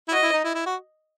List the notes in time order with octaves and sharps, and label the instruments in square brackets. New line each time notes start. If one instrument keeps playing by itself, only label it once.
[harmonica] E4
[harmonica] F#4 [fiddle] D#5
[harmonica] E4
D#4
E4
E4
F#4